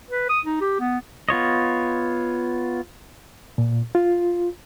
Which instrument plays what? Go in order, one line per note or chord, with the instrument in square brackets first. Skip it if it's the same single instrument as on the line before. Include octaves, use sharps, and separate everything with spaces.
[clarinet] B4
D#6
D#4
G4
B3
[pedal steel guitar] B3 F4 C#5 D#5
[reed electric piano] A#2
F4